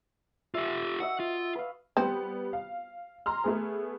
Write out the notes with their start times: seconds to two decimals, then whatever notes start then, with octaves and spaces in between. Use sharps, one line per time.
0.54 F4 G4 E5
1.00 F#4 D#5 E5 F#5
1.20 F4
1.55 B4 F5
1.97 G3 B3 C4 G4
2.53 F5
3.26 A#5 C6 F6
3.44 A3 B3 G#4